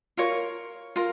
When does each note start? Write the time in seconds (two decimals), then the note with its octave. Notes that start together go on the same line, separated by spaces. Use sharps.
0.17 F4 A#4 C#5
0.96 F4 A#4